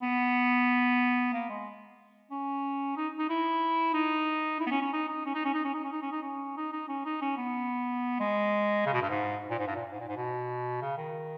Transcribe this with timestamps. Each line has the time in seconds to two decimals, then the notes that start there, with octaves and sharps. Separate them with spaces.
0.02 B3
1.33 A#3
1.49 G#3
2.31 C#4
2.97 D#4
3.18 D#4
3.29 E4
3.94 D#4
4.60 E4
4.67 B3
4.71 C#4
4.81 C#4
4.93 D#4
5.08 D#4
5.26 C#4
5.34 D#4
5.45 C#4
5.54 D#4
5.64 C#4
5.74 D#4
5.84 C#4
5.92 D#4
6.02 C#4
6.12 D#4
6.22 C#4
6.57 D#4
6.72 D#4
6.88 C#4
7.05 D#4
7.21 C#4
7.37 B3
8.20 G#3
8.86 C#3
8.93 B2
9.02 G2
9.10 G#2
9.50 A#2
9.59 G#2
9.67 G2
9.76 A#2
9.92 G#2
10.00 A#2
10.08 G#2
10.17 B2
10.82 C#3
10.98 D#3